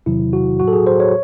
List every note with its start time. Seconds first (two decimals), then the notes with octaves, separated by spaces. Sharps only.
0.06 E2 C3 D#3 F#3 E4
0.33 F#4
0.60 A2 F#3 F#4
0.68 A4
0.73 G#4
0.87 C5
1.00 C#5